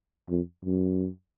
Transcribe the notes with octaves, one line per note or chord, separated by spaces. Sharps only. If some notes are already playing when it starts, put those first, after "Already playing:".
F2
F#2